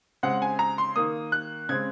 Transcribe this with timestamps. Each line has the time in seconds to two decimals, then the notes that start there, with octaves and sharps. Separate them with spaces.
0.23 C#3 G#3 C4 F#5
0.42 G#5
0.59 A#5
0.78 C6
0.96 D#3 A#3 D#6
1.32 F#6
1.69 C#3 G#3 C4 G#6